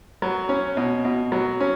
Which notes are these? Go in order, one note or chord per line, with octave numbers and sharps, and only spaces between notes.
F#3
C#4
B2
B2
F#3
C#4